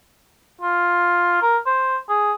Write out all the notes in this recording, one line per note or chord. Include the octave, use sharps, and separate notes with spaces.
F4
A#4
C5
G#4